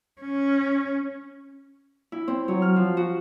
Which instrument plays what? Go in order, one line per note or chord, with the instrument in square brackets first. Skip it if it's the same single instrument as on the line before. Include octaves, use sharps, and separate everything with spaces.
[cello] C#4
[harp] E4
C4
F#3
F6
F3
F#4